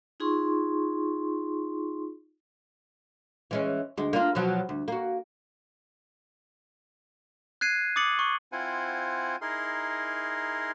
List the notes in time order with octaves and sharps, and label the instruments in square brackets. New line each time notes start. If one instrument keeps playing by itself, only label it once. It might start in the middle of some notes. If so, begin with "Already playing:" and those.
[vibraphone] D#4 F4 G#4 C6 C#6
[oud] E3 G#3 C#4
D2 G#3
A#3 D4 F4
B2 F3 F#3
D2
A#3 F#4
[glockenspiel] F#6 G#6 C7 D#7
D6 D#6 A6 C#7 F#7
C#6
[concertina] C4 E4 F4 C5 F#5 G#5
D#4 E4 G#4 A#4 C6